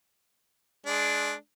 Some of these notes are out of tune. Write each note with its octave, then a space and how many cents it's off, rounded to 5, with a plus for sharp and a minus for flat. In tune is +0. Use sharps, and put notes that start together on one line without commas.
G#3 +25 D4 +0